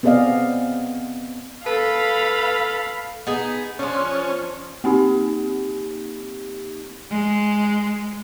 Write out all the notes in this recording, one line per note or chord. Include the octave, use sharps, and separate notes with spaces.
B3 C4 G#4 D5 D#5 F5
A4 B4 F5 B5
B3 D#4 G#4
F3 C#4 D4
A#3 C4 D#4 G4
G#3